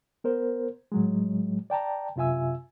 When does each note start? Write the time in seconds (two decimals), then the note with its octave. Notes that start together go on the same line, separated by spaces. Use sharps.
0.24 B3 A#4 C5
0.92 A2 F#3 G#3
1.70 D5 G5 A5 A#5
2.16 F#2 C3 F4 E5 G#5 E6